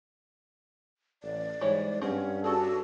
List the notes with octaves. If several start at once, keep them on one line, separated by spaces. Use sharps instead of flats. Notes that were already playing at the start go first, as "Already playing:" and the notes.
A1 D5
G#2 E3 G3 C#5
G2 F#3 C4 C#4
C#4 D4 F#4 G#4 A4